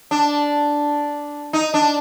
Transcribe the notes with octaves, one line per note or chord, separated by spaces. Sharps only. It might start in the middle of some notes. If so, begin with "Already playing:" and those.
D4
D#4
D4